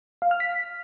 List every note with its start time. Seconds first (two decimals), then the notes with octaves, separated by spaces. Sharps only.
0.22 F5
0.31 F6
0.40 B6